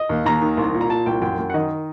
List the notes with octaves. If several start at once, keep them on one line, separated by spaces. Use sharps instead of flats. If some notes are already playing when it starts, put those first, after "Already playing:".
Already playing: D#5
D#2
D#2 A#5
D#3
C2
A#2
A#5
A#2 A5
C2 G5
F#2 G5
F#2
F#5
D#3 D#5